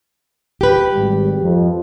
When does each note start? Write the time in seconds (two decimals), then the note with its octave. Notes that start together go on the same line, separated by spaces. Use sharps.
0.61 G4 B4
0.94 G#1 G3
1.42 F2